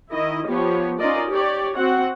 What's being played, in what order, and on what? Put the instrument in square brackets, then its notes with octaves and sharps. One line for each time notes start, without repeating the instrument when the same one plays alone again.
[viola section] D#3 E4 D#5
F3 B3 G4 C#5
C#4 D#4 F4 A#4 D5 D#5
G4 C#5 D5
C4 F#4 F#5